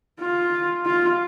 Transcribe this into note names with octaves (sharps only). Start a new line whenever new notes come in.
F4
F4